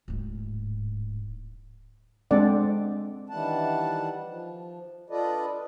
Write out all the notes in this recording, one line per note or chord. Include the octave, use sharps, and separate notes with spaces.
D1 G#2
G#3 C4 D4 A4 D5 F#5
D#3 E3 G3 D4 F#5 A5
F3
D4 F4 A4 B4 D5 D#5